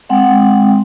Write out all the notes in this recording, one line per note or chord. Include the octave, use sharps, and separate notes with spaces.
G#3 C4 F#5 G5